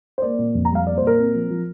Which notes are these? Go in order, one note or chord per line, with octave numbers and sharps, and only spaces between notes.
C5
A#3 D5
A#2
F2
A#5
G3 F5
A#3 D5
C5
A#2
A#4
C4
F3
F3